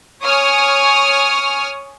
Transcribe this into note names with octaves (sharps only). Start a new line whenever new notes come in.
C#5 G#5 C#6 D#6 F6